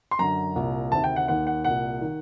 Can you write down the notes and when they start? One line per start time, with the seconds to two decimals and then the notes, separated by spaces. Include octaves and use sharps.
0.11 C6
0.19 F#2 D3 A#5
0.56 C2 A#2
0.92 D2 C3 D#3 A5
1.04 G5
1.16 F#5
1.28 D#2 D#3 F#5
1.47 F#5
1.64 C2 A#2 F#5
2.01 D#3